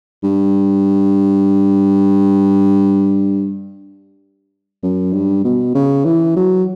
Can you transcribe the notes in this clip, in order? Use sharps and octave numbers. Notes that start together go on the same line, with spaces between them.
G2
F#2
G2
B2
C#3
E3
F#3